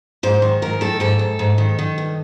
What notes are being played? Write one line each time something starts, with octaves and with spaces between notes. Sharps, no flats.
G#2 C5
D#3
G#2 A#4
D#3 A4
G#2 A4
G#2
G#2
D#3
D#3
G2